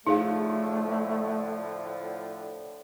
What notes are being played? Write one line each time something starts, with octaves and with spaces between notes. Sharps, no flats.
A2 D3 F3 A3 D#4 G#4 F5